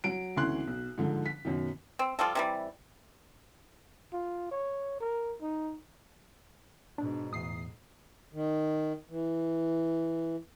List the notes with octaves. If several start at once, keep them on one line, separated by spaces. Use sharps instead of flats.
F#3 D7
G#1 D2 E3 C#4 C6 F#6
B1
G#2 D3 F3
B6
F#2 B2 D#3
C4
F3 G3 F4 A4
C3 E3 G3
F4
C#5
A#4
D#4
G#2 B2 D4
E2 A2 D#6 C7
D#3
E3